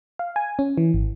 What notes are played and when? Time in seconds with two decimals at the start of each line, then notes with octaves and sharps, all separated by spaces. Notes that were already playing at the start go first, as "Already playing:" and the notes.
0.19 F5
0.36 G#5
0.59 C#4
0.78 E3
0.94 G#1